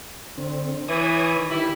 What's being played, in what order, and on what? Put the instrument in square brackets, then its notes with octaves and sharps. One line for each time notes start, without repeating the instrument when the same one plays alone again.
[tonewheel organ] D3 C4
[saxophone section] E3 [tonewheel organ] C#5 G#5 D#6
[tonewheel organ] D#3
[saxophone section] G3 E4